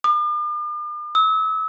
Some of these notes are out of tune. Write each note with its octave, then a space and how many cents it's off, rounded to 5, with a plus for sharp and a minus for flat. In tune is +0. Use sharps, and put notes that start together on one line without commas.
D6 +45
E6 -35